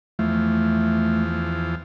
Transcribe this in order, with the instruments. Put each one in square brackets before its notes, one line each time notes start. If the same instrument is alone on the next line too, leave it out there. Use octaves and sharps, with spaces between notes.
[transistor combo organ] E2 F3 [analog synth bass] A3